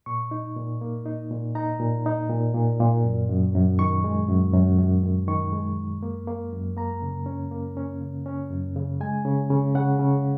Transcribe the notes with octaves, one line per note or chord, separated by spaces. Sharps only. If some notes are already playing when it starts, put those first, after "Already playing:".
A#2 C#6
D#4
A#2
A#3
D#4
A#2
D#4 A#5
A#2
D#4
A#2
A#2
A#2
F#2
F#2
F#2
D#3 C#6
G#3
F#2
F#2
F#2
F#2
D#3 C#6
G#3
F#2
A#3
A#3
F#2
A#3 A#5
C#3
C#4
A#3
C#4
C#3
C#4
F#2
C#3
G#3 G#5
C#3
C#3
C#3 F#5
C#3